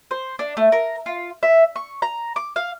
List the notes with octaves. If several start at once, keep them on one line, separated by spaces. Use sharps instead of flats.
C5
D4
A3
A#4
F4
E5
C#6
A#5
D6
F5